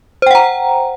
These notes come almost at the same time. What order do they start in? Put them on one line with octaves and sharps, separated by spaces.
C5 G5 F#5 A#5